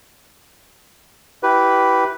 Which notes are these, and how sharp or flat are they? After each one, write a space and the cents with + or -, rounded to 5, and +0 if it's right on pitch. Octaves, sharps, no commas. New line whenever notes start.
E4 +0 G4 -20 B4 +0